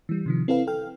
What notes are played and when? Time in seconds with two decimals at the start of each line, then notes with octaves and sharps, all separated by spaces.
0.09 E3 G3
0.26 C3 D#3 F3
0.48 C4 E4 A4 B4 F5
0.67 A4 G5 F6